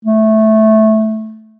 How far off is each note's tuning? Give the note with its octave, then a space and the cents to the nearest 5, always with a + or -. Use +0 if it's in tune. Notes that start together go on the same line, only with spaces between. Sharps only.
A3 -10